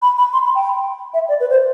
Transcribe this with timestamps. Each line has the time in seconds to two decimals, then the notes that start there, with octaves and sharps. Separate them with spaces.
0.02 B5
0.18 B5
0.33 C6
0.45 B5
0.55 G5
1.14 E5
1.29 D5
1.40 B4
1.50 C5